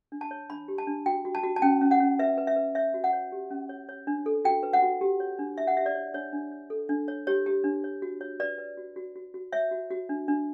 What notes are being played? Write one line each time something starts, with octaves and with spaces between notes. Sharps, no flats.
D4
A5
C#5
D4 B5
G4
A5
D4
F#4 G5
F#4
A5
F#4
A5
C#4 G5
C#4
F#5
C#4
B4 E5
B4
E5
B4
C#5 E5
F#4
F#5
C#5
G4
C#4
C#5
C#5
D4
A4
F#4 G5
B4
F#5
F#4
G4
C#5
D4
E4 E5
F#5
G4 E5
D5
C#5
D4 C#5
D4
C#5
A4
D4
C#5
G4 C#5
G4
D4
C#5
F#4
C#5
B4 D5
B4
F#4
F#4
F#4
F#4
C#5 E5
F#4
F#4
D4
D4